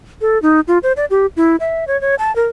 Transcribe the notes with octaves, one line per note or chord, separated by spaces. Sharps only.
A4
D#4
F4
C5
D5
G4
E4
E5
C#5
C#5
A5
A#4